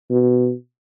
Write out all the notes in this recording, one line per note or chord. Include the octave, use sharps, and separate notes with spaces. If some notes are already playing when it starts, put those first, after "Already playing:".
B2